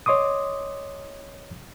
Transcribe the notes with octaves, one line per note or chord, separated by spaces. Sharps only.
C#5 D#5 C6 D6 D#6